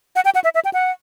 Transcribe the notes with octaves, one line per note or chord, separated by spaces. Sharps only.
F#5
G5
F#5
E5
E5
G5
F#5